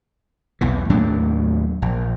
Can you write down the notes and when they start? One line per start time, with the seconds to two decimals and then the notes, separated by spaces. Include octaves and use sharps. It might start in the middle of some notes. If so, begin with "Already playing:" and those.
0.61 B1 E2 E3
0.89 D#2 A2 F#3 D4
1.82 A#1